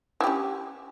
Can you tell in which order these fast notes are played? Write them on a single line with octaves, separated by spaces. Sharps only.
E4 G4 C#4